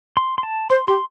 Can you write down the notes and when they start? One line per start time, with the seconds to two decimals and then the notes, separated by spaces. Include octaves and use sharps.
0.17 C6
0.38 C6
0.43 A5
0.70 C5 C6
0.87 G4 C6